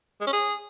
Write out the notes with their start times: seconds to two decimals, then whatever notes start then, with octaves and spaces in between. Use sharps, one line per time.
0.21 G#3
0.27 C#4
0.33 G#4